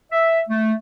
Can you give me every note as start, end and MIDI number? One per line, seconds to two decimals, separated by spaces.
0.12 0.41 76
0.49 0.74 57